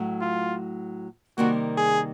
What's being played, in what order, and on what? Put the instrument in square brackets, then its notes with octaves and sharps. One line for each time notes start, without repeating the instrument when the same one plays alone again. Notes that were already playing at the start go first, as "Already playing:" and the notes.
Already playing: [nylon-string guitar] A2 F#3 A3
[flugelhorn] F4
[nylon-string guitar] C3 D#3 G3 A#3 [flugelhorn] F#4
[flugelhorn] G#4